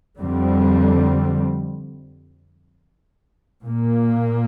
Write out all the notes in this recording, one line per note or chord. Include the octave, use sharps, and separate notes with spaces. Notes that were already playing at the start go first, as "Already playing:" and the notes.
F2 D3 G3 C4
A#2 A#3